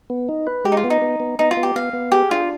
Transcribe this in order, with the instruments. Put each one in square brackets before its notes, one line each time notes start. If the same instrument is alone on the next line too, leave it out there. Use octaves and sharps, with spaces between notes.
[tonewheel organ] B3
D#4
B4
[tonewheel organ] G#3 [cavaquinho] G4
[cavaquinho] D#4
F4
[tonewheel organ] B3
[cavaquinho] D#4
[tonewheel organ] B3
B3
[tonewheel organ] B3 [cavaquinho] D#4
[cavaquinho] F4
[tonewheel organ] B3
[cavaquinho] G4
[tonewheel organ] B3 [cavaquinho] F5
[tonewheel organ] B3
[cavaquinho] G4 [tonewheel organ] G#4
[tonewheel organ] D4 [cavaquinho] F4